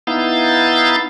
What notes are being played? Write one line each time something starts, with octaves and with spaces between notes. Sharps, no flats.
B3 D#4 E4 F5 G6 A6